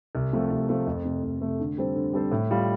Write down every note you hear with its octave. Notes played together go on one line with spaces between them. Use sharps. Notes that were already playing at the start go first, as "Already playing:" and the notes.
C2
C3 F3 A3
C2
C3 F3 A3
F2
C3 A3
F2
C3 A3
D3
G3 C4 A4 C5
D3
G3 C4 A4 C5
A2
G3 F4